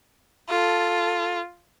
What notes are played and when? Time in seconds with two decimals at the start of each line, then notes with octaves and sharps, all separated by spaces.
0.50 F4 A4